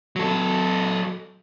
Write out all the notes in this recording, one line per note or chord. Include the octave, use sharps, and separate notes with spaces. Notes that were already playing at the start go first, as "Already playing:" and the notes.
F#3 A4